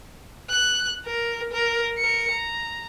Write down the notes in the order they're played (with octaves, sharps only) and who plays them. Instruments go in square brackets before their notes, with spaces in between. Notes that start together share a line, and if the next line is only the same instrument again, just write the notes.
[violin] F#6
A#4
A#4
A#4 C#7
A#5